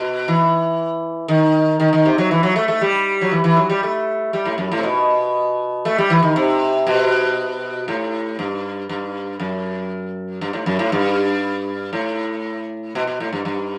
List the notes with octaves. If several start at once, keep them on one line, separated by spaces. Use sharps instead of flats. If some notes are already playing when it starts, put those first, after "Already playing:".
Already playing: B2
E3
D#3
D#3
D#3
C3
F#3
E3
F#3
A3
A3
G3
F#3
E3
E3
F#3
G3
A3
G3
A2
F#2
A2
C3
B2
A3
G3
E3
D#3
C3
B2
A2
G2
G2
F#2
G2
A2
F#2
A2
G2
A2
B2
B2
A2
G2
G2